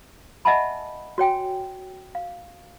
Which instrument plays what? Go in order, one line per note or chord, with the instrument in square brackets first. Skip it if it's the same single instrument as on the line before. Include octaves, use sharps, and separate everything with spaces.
[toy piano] D#5 E5 F#5 G#5 A5 B5
F#4 C#5 G5 G#5
F5